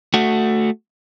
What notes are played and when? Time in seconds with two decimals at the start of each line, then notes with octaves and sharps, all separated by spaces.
0.14 A3 F#4